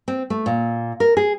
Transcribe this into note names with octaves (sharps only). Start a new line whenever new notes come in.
C4
A3
A#2
A#4
G#4